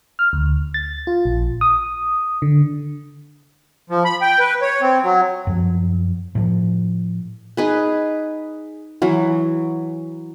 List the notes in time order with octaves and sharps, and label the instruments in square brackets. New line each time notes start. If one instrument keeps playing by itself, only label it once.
[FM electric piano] F6
D2
A6
F4
A#1
D#6
D3
[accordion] F3
B5
G5
B4
C#5
C4
F#3
[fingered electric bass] F#2 F3
A2 F3
[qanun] D#4 G#4 B4
E3 F#3